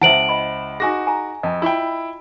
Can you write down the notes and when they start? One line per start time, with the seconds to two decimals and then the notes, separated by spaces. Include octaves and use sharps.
0.02 C#2 E4 C5 E5 F#5 A5 D7 F#7
0.29 D#5 B5
0.80 D#4 F#4 G#4 G#5 A#6
1.07 G#5 A#5
1.43 F2 D#5 A5
1.62 E4 F4 G5 B5